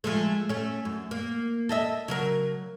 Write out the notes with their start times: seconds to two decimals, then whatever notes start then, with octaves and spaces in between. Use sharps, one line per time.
0.04 F3 G#3 A3
0.49 A3 C#4
0.85 F#2
1.11 A#3
1.69 A4 D#5 E5
2.08 C#3 F#3 A#4